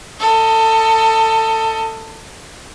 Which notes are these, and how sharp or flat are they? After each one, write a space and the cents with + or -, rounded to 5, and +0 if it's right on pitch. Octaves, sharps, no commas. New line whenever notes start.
A4 +25 D#5 +20